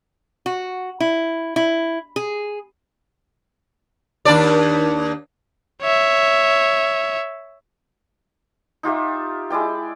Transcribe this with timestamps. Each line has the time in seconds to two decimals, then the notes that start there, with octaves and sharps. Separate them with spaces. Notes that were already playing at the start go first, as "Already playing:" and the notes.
0.46 F#4
1.00 E4
1.56 E4
2.16 G#4
4.25 D#2 D4 D5
5.82 C#5 E5
8.83 D#4 F4 G4 E5
9.50 G#3 E4 D5 G5